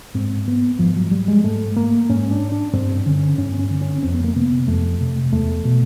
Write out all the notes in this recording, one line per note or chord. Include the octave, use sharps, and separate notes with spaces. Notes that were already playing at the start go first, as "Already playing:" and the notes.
G#2 C4
B3
G#2 F3
F#3
G3
G#3
G#2 A3
A#3
G#2 C#4
D4
D4
G2 C4
D3 C#4
G2 C#4
C4
C#4
D3
C#4
F2 C4
B3
A#3
C3 B3
F2 A3
C3
E2 A3
B2